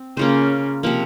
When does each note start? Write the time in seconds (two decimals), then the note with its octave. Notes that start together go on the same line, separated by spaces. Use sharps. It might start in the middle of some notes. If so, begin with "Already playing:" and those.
Already playing: C4
0.17 C#3 A#3 C#4 F4 C5
0.83 C3 F3 A#3